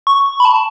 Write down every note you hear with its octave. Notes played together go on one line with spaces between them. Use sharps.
C#6
C#6
B5
A5